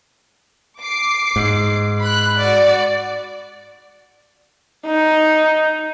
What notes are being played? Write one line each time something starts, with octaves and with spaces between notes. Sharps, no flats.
D6 C7
G#2
B5 F#6
F#4 D5
D#4